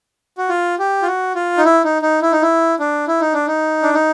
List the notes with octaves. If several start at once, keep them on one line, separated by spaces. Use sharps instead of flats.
F#4
F4
G4
F4
F#4
F4
D#4
E4
D#4
D#4
E4
D#4
E4
D4
E4
D#4
D4
D#4
D4
D#4